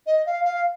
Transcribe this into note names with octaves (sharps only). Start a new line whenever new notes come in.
D#5
F5
F5